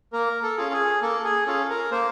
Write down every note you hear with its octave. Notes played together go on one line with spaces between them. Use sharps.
A#3 A#4
A4
C#4 F4 G#4
G#4
A#3 A4
G#4
C#4 F4 G#4 A4
A#4
A#3 C5